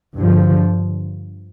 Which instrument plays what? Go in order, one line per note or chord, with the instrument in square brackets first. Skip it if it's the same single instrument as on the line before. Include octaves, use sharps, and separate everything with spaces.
[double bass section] G2 D3 F3